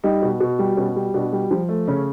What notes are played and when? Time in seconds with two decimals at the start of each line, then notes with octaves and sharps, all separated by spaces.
0.04 G3 D#4
0.22 B2
0.40 B2
0.59 G3
0.77 B2 C#4
0.96 G3
1.14 B2 D4
1.32 G3
1.51 F3
1.69 A3
1.87 C#3 C#4